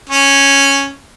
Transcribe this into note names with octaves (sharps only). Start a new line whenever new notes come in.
C#4